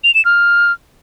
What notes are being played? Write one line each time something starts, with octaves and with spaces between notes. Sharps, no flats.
F7
E7
F6